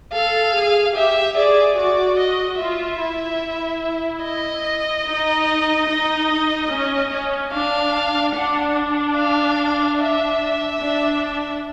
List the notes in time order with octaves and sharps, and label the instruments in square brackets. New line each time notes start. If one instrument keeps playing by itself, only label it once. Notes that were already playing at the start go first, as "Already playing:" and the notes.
[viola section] A4 [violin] F5
[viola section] G#4
[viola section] G4 [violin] E5
[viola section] G#4 [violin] D5
[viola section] F#4 [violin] D5
[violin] D#5
[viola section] F4 [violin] E5
[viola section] E4
[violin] D#5
[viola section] D#4
D#4
C#4
C#4
[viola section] D4 [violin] F5
[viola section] D4 [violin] F#5
[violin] F5
E5
[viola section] D4